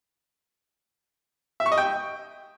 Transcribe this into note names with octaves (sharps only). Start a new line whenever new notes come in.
E5
C#6
D#5
G5